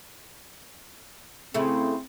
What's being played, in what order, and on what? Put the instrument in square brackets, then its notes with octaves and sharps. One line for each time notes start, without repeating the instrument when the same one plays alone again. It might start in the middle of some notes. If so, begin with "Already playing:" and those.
[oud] C#3 A3 E4 [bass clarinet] C4